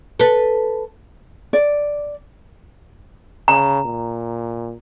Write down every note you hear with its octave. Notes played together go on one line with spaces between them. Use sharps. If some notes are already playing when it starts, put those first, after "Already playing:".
A4 B4
D5
C#3 A#5
A#2